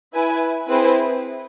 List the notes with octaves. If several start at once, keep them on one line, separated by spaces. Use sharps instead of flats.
E4 B4 E5 G#5
C4 E4 G#4 B4